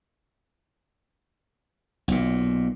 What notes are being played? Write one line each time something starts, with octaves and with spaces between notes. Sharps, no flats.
B1 A#2